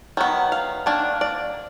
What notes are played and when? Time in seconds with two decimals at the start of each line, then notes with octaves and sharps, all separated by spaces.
0.17 D#3 F#3 B3
0.52 F5
0.86 D#3 A#3 D4
1.21 D5